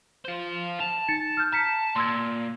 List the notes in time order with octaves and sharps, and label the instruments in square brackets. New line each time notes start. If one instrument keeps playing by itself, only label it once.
[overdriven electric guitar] F4 C5
[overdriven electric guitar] A5 [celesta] F7
[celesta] D#4 A6 C#7
F6 G6
[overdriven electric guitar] A5 [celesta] A#5 B6 C#7
[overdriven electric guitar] A#2 [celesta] C6 E6 G#6